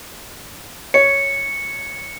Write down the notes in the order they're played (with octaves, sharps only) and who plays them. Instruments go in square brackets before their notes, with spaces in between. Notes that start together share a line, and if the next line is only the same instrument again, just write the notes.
[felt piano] C#5 [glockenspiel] C#7